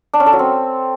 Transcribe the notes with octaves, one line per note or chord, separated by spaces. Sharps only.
D4
C#4
A4
F#3
C4